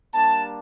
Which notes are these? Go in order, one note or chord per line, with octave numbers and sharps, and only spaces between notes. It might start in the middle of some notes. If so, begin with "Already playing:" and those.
G3 A#3 D4 A5